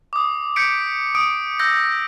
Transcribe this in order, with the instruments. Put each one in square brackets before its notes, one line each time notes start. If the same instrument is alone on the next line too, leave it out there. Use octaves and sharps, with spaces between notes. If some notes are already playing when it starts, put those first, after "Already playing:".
[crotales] D6 D#6
D#6 G6 B6 C#7 D7
D#6 D7
E6 G6 A#6